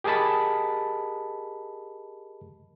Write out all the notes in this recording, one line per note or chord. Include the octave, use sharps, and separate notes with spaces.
G4 G#4 A#4 D#5 A5 B5